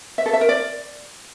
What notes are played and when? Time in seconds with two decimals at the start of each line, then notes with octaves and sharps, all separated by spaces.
0.18 E5
0.26 A4
0.33 E5
0.41 A#4
0.49 D5